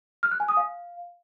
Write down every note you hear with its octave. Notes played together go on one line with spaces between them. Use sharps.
F6
F#6
G#5
D#6
F5